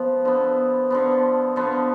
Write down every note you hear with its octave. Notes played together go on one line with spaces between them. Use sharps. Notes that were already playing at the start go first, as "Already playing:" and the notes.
Already playing: F3 B3
D3 F3 B3
D3 F3 B3
D3 F3 B3